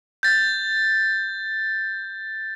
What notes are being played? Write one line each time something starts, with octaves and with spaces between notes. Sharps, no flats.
G6 A6